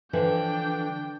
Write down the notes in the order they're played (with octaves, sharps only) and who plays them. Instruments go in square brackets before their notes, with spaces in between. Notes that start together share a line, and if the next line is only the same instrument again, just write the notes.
[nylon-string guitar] D3 E3 F3 [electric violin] D4 G5